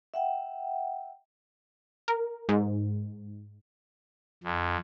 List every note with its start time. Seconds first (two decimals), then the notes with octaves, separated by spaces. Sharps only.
0.14 E5 F#5 G5
2.08 A#4
2.49 G#2
4.44 F2